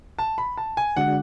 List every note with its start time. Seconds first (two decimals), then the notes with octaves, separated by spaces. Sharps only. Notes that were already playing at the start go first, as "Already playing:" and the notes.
0.19 A5
0.38 B5
0.58 A5
0.77 G#5
0.96 D3 G#3 D4 F#4 F#5